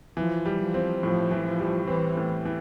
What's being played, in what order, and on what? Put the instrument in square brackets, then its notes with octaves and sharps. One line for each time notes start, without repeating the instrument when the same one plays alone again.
[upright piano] E3 [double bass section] F3
[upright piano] G3
[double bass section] F3
[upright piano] C4
[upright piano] A2 [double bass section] F3
[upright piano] E3
[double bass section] F3
[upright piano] G3
[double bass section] E3 [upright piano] C4
[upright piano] A2
E3